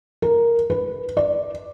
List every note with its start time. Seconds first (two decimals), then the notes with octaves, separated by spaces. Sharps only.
0.22 A#4
0.70 B4
1.17 D5